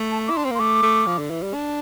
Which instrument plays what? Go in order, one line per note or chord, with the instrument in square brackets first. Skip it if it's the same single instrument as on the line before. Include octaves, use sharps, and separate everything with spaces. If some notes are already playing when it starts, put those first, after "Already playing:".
Already playing: [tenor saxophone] A3
[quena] A5
[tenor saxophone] E4 [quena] D6
[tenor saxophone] D4 [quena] C6
[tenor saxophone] C4
A#3
[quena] C6
[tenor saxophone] A3 [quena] D6
[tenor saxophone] A3
F3
D3
E3
G3
D4